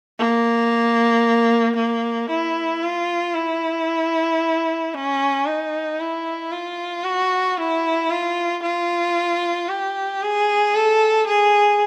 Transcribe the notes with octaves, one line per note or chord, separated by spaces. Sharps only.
A#3
A#3
E4
F4
E4
C#4
D#4
E4
F4
F#4
E4
F4
F4
G4
G#4
A4
G#4